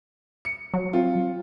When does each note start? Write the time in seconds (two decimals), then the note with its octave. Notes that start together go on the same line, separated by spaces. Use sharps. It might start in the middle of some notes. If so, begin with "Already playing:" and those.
0.45 C#7
0.74 F#3
0.93 C4 F4